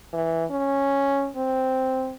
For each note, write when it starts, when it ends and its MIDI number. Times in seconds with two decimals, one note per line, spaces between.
0.13 0.45 52
0.50 1.29 61
1.37 2.14 60